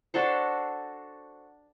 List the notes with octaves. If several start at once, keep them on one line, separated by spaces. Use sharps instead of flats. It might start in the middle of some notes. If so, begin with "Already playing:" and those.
D4 F#4 A4 C5